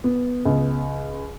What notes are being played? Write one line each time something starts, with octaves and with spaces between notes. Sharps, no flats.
B3
C#2